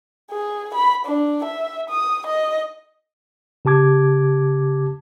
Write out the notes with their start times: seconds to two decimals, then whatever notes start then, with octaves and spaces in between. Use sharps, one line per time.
0.31 G#4
0.74 B5
1.05 D4
1.44 E5
1.89 D#6
2.26 D#5
3.65 C#3 G4 A5 D6 G#6